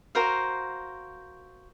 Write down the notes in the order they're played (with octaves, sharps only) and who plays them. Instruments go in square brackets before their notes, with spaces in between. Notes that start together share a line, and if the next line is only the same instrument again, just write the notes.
[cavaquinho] F#4 A#4 C5 F5